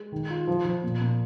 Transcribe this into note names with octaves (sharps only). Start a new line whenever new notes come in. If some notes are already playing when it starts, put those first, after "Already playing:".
Already playing: G#3
D#3
F4
F3
F3
A#2
A#2